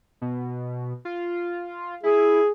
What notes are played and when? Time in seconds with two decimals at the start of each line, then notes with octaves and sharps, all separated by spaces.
0.22 B2
1.05 F4
2.03 E4 G#4